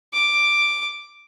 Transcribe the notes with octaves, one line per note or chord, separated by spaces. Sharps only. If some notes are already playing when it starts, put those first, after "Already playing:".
D6